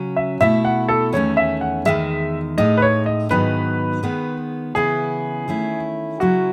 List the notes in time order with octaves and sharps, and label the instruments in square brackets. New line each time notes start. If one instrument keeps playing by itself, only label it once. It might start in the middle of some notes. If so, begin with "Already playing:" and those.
Already playing: [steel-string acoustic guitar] C#3 F#3 C#4
[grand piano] E5
[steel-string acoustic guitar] B2 A3 E4 [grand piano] E5
[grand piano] F#5
A4
[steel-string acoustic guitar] E2 D#3 A3 C#4 [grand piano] C#5
[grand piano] E5
F#5
[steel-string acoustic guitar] E2 D#3 G#3 [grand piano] E5
[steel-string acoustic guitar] A2 G#3 D#4 [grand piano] D#5
[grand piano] B4
C#5
D#5
[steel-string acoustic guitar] G#2 D#3 F#3 B3 D#4 [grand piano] B4
[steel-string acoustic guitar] D#3 G#3 B3
[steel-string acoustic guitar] C#3 E3 B3 E4 [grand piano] G#4
[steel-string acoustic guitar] D#3 A3 C#4 E4
[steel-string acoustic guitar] C#3 F#3 C#4 E4 [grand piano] F#4